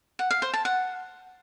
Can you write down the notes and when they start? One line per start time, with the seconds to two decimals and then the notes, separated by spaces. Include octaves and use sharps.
0.19 F#5
0.31 F5
0.42 C5
0.54 A5
0.65 F#5